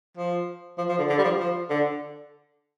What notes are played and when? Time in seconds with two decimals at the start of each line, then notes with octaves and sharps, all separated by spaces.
0.17 F3
0.78 F3
0.89 F3
0.98 D3
1.09 D3
1.18 G3
1.24 F3
1.39 F3
1.70 D3